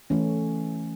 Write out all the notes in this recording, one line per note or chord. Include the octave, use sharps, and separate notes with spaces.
E3 A3 C#4